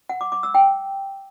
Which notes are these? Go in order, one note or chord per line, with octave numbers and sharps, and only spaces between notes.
F#5
D6
D6
E6
G5